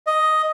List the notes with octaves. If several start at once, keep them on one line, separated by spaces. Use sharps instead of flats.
D#5